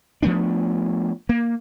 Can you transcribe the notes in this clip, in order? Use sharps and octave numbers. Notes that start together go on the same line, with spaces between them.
F3 A3 B3 D4
A#3